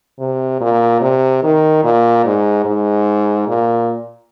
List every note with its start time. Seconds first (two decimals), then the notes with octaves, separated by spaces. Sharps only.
0.19 C3
0.60 A#2
1.01 C3
1.43 D#3
1.83 A#2
2.25 G#2
2.65 G#2
3.48 A#2